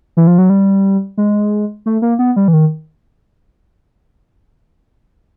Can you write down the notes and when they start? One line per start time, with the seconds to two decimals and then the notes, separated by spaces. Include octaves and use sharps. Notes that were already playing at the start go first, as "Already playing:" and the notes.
0.17 E3
0.27 F3
0.38 F#3
0.50 G3
1.18 G#3
1.86 A3
2.02 A#3
2.19 B3
2.36 G3
2.48 E3
2.53 D#3